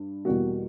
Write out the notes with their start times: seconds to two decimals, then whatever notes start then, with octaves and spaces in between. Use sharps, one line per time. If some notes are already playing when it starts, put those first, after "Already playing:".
Already playing: G2
0.25 E2 B2 G3 A#3 F#4